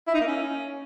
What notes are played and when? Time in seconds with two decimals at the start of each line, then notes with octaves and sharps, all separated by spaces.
0.07 E4
0.14 D#4
0.20 A#3
0.27 C#4